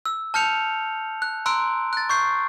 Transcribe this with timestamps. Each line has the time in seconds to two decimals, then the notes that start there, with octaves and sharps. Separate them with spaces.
0.06 E6
0.34 A5 F6 G6 C#7 F7
1.22 F#6
1.46 A#5 C6 E6 F#6 D7
1.93 F#6 A6
2.09 C#6 G6 C7